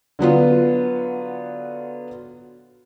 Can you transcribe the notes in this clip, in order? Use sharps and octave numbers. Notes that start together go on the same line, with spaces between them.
D3 F#3 B3 F4